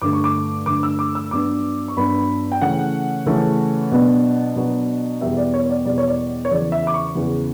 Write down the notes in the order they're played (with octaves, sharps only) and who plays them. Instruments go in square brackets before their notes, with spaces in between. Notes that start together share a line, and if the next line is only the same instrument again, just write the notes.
[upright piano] G2 D3 A3 D6
C#6
D6
G2 D3 A3 D6
E6
D6
E6
G2 F#3 B3 D4 D6
C#6
G2 F#3 B3 D4 B5
G5
C#3 E3 A3 C#4 F#5
C#3 E3 A3 C#4
B2 F#3 B3 D4
B2 F#3 B3 D4
E2 B2 G3 B3 E5
D5
C#5
C#5
D5
E2 B2 G3 B3 D5
C#5
D5
C#5
E2 C#3 E3 D5
E5
D6
C#6
E2 C#3 E3